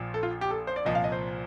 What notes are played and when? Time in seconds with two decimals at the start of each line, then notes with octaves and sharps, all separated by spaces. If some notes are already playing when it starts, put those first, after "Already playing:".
Already playing: A#1 A#2 F3
0.14 A4
0.23 F4
0.41 G4
0.50 A4
0.67 C5
0.76 D5
0.85 C2 A#2 F3 D#5
0.95 F5
1.04 D#5
1.12 C5